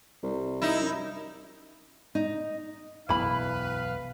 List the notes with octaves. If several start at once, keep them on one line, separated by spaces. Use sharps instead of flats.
C2
D#4 E4
F#2
D#4
E1 B1 F#2 E4 B4 F5 B5